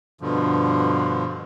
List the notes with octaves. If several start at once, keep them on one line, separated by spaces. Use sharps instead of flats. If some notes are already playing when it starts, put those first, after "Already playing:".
G2 B2 D3 F3